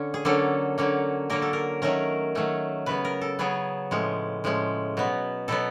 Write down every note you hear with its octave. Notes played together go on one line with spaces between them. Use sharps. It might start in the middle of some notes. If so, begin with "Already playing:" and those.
Already playing: D3 C#4
G#4
D3 F#3 A#3 C#4 A4
D3 F#3 A#3 C#4
D3 F#3 A#3 C#4 A#4
A4
A#4
D#3 F#3 A3 C#4 A#4
D#3 F#3 A3 C#4
C#3 F#3 B3 B4
A#4
A4
C#3 F#3 B3 G#4
A2 F3 G#3 C#4
A2 F3 G#3 C#4
B2 F#3 B3
B2 F#3 B3 A4